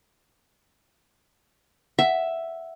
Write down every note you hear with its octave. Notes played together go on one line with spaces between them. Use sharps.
E5 F#5